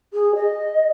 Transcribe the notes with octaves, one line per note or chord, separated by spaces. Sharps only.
G#4
D#5